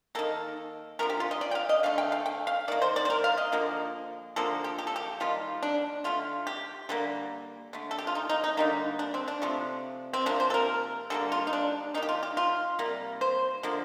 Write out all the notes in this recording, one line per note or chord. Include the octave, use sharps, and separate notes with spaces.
D#3 A#3 A4
D3 F3 A3 A#4
G4
F4
D#5
D5
G5
F5
D#5
D3 A3 F5
G5
F5
G5
F5
D#3 A#3 D5
C5
D5
C5
A#4
F5
D#5
D3 F3 A#3
D3 F3 A#3 A4
G4
G4
A4
G4
D#3 G3 A#3 F4
D4
D3 A3 F4
G4
D3 G3 A#3
D3 A3
A4
G4
F4
D#4
D#4
D#4
D3 G3 A#3 D#4
D4
C4
D4
C3 F3 A3
C4
C3 F3 A#3 D4
C5
A4
A#4
D3 G3 A#3 A4
F4
D#4
D4
D#3 A#3 D#4 G4
F4
G4
F4
C3 G3 A#3
C5
D3 F3 A#3